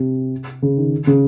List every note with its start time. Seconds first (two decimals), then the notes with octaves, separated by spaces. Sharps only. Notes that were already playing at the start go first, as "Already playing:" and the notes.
Already playing: C3
0.62 C#3
0.77 D#3
1.07 C#3